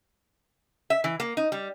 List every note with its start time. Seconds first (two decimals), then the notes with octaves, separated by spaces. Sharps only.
0.90 E5
1.04 E3
1.20 A#3
1.37 D#4
1.52 G3